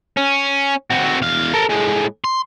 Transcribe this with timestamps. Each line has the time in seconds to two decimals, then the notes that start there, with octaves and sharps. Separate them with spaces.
0.17 C#4
0.90 C4 F#4
1.22 E2 F5
1.54 A4 A#4
1.70 A2 G#3
2.24 C6